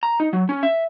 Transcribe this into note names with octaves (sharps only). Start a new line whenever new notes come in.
A#5
D#4
F#3
C#4
E5